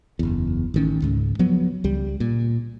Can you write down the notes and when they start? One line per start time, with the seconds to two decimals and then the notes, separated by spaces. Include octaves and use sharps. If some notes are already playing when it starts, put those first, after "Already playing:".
0.19 F#1 E2
0.74 A1 D#3 C#4
1.02 C#2 G#2
1.39 F3 F#3 B3
1.84 C#2 G3
2.20 A#2